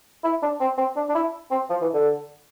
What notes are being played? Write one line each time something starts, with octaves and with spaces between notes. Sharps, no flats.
E4
D4
C4
C4
D4
D4
E4
C4
F3
E3
D3